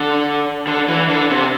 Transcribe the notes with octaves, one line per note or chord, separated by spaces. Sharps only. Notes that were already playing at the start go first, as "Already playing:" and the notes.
Already playing: D3
D3
E3
D3
C3